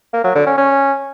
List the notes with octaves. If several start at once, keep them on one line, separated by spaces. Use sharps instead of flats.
A#3
F#3
D3
C#4
C#4